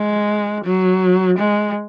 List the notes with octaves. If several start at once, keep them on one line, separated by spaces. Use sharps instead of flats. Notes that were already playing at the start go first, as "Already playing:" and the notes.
Already playing: G#3
F#3
G#3